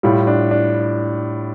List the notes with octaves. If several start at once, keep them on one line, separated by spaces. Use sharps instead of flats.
A2 G3 F4
D4
D4